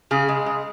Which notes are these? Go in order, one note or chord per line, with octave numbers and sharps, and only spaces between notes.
C#3 G#4
G#3
G#3